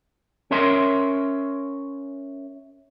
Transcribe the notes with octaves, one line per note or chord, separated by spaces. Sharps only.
C#4 A#4 C#5 E5 C6